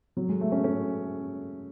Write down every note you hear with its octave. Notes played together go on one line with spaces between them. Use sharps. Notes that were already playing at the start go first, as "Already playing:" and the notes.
F#3
G#3
A3
C#4
C#4